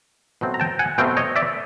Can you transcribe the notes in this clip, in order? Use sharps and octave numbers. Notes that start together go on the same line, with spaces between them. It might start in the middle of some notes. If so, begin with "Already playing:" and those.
B2 F#3 A3 C4
A#5
G5 A5
F#5 G#5
B2 F#3 A3 C4 F5 G5
C#5 D#5
D5 E5